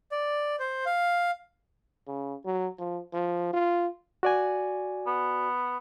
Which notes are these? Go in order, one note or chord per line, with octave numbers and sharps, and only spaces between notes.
D5
C5
F5
C#3
F#3
F3
F3
F4
F#4 D5 G#5
B3